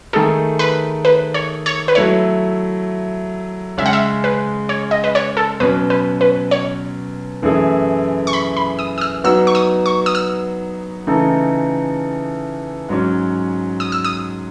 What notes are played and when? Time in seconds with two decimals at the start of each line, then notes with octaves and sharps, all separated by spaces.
0.13 D#3 A3 D#4 G#4 A4
0.59 B4
1.05 B4
1.34 C#5
1.66 C#5
1.88 B4
1.95 F#3 A3 E4 C#5
3.78 C#3 G#3 C#4 E5
3.86 F#5
3.93 E5
4.24 B4
4.69 C#5
4.91 D#5
5.04 B4
5.15 C#5
5.37 A4
5.60 B2 F#3 C#4 B4
5.90 B4
6.21 B4
6.51 C#5
7.42 F#2 E3 A3 E4 G#4
8.27 C#6
8.33 B5
8.57 B5
8.79 D#6
8.98 D#6
9.01 E6
9.24 F#3 B3 D#4 F#4 E6
9.47 C#6
9.55 D#6
9.86 C#6
10.06 D#6
10.15 E6
11.07 C#3 E3 A3 D#4 A4
12.89 G#2 F#3 C#4
13.80 D#6
13.92 E6
14.04 D#6